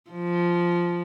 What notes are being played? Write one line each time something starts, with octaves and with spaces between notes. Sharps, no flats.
F3